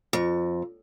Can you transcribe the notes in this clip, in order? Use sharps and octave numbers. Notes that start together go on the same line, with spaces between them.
F2